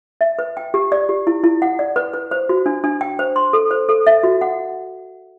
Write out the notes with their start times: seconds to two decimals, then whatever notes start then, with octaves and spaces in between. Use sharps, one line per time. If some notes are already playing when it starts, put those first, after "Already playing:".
0.21 E5
0.39 B4
0.57 G5
0.74 G4
0.92 D5
1.09 G4
1.27 E4
1.44 E4
1.62 F#5
1.79 D5
1.96 B4
2.14 B4
2.31 C5
2.49 F#4
2.66 D4
2.84 D4
3.01 G5
3.19 C5
3.36 C6
3.53 A4
3.71 C5
3.89 A4
4.07 E5
4.23 F#4
4.41 F#5